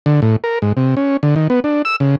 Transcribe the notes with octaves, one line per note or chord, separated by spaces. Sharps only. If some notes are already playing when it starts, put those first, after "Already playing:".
D3
A2
A#4
G#2
C3
C#4
D3
D#3
B3
D4
E6
C#3